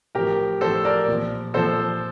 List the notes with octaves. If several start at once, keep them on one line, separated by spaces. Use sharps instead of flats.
A2 F3 G4 A#4
A2 F3 A4 C5
A#4 D5
A#2
F3
A#2 F3 A4 C5